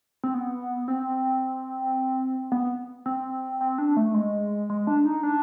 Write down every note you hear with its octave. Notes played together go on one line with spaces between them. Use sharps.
C4
B3
C4
B3
C4
C4
D4
A3
G#3
G#3
D4
D#4
D4